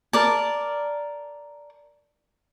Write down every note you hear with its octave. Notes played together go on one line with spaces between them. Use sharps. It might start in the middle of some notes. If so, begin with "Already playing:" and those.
A#4 D5 A5